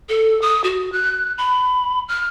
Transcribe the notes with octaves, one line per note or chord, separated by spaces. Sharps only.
A4
D#6
F#4
F#6
B5
F6